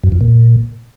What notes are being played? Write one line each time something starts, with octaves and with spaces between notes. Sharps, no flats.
F#2
F2
A#2